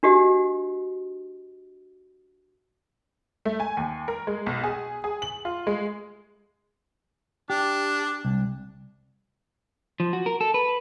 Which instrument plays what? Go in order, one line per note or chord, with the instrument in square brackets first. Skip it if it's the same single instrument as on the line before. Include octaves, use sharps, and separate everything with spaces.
[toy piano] D4 F#4 G4 D#5
[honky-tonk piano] A3
G#5
D#2
A#4
G#3
B1
G#4
G#4
F#7
F4
G#3
[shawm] D4 [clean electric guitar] G4
[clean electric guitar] C2
[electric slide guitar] F3
F#4
A#4
A4
B4